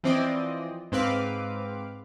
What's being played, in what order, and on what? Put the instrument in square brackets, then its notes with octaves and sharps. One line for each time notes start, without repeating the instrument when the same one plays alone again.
[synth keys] E3 F3 C4 D5 D#5
G#2 C4 B4 F5 D6